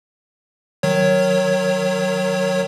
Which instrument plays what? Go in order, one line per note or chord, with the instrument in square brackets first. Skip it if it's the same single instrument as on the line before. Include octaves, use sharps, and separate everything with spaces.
[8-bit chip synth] D#3 F#3 C#5